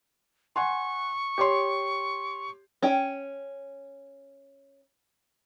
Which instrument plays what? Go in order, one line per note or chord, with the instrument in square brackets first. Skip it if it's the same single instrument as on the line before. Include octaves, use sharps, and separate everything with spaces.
[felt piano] F#5 G#5 C6 [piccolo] C#6
[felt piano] G4 C#5 C6
[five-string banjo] C#4 G5